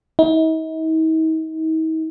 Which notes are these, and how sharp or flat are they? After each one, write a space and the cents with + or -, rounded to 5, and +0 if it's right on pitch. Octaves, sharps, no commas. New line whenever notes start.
D#4 +40